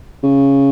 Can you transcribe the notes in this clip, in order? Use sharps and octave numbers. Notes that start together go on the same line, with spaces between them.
C#3